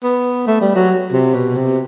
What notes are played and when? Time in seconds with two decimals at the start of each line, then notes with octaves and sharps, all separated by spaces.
0.03 B3
0.47 A3
0.61 G3
0.75 F#3
1.12 C3
1.34 B2
1.56 C3